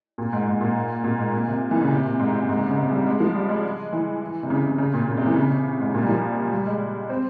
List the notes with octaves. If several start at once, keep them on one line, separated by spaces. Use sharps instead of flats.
A#2
G#2
G#2
A#2
A#2
G#2
A#2
C3
E3
C#3
C3
A#2
G#2
G#2
G#2
C3
C#3
C3
G3
G#3
F3
G3
G#3
E3
C3
C#3
C#3
C#3
A#2
A#2
C3
E3
C#3
C3
G#2
A#2
G3
F3
G3
G#3
C4